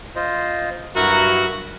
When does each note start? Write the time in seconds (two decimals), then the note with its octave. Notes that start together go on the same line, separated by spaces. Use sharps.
0.16 F4 C5 D#5
0.96 G2 F#3 E4 F#4 A#4 A#5